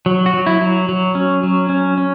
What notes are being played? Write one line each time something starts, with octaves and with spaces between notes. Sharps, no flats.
F#3
F#4
F#3
E4
F#3
F#3
C#4
F#3
C#4
C#4